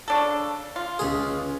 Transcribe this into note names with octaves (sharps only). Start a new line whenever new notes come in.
C#3 D4 A4
F4
C#2 G#4